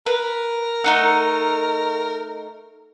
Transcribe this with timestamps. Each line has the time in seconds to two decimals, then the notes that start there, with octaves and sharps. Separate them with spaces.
0.06 A#4 B4
0.84 A3 D#4 F#5